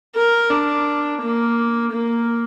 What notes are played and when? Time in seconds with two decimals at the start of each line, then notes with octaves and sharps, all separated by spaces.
0.16 A#4
0.51 D4
1.22 A#3
1.92 A#3